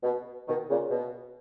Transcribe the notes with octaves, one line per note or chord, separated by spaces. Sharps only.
B2
B2 D#3
A#2 C#3
B2